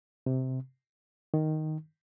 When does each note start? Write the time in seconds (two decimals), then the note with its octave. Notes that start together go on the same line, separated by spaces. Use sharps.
0.26 C3
1.34 D#3